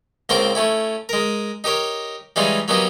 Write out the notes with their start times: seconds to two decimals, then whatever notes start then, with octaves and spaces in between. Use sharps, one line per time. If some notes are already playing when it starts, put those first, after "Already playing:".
0.29 C#2 A#3 C4 C5 G5 C#6
0.55 A3 C#4 E4
1.09 G#3 A#4
1.64 D#4 G4 A#4 C#5
2.36 E3 G3 G#3 C#4 D#4 F4
2.68 F#3 A#3 B3 C#4 D#4 G4